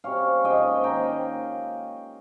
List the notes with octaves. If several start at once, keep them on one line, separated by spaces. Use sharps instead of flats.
C3 G3 C#4 C#5 F5
G#2 F3 A#3 C#4 D#5 G5
D#3 A#3 C#4 G5 A#5